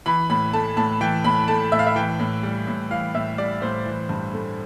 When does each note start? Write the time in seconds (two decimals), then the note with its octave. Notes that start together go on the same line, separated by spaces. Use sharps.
0.06 E3 B5
0.30 A2 B5
0.53 A3 A5
0.77 A2 A5
1.01 E3 G5
1.24 A2 B5
1.48 A3 A5
1.72 A2 E5
1.79 F5
1.86 E5
1.96 E3 G5
2.19 A2
2.43 G3
2.67 A2
2.91 E3 F5
3.15 A2 E5
3.38 G3 D5
3.62 A2 C5
3.86 E3
4.09 G2
4.33 A3